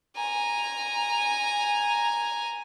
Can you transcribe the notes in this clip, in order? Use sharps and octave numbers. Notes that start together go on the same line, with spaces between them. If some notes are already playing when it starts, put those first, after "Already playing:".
G#5 A#5